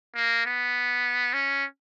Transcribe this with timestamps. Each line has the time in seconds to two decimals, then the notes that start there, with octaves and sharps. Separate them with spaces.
0.16 A#3
0.46 B3
1.34 C#4